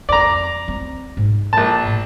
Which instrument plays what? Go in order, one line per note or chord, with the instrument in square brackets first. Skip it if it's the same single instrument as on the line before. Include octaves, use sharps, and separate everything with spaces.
[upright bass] F2 [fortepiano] D5 A#5
[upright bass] C4
G#2
[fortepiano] A#1 A5
[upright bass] A2